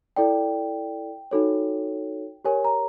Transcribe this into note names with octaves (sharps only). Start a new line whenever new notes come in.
E4 A4 D5 G5
D#4 F#4 A4 C#5
G4 A#4 C#5 G#5
A#5